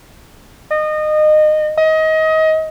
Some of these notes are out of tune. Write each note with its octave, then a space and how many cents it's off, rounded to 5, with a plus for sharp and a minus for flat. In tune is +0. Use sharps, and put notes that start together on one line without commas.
D#5 -25
D#5 +25